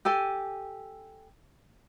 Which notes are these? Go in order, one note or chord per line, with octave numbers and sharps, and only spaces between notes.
G4 A4 G#5